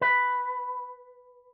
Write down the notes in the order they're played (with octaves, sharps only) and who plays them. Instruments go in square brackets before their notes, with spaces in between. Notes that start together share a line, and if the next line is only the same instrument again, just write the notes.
[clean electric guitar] B4